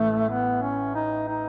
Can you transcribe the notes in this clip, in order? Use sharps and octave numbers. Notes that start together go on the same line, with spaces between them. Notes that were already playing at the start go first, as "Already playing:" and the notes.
Already playing: A1 A2 A3
B3
C#4
D#4
D#4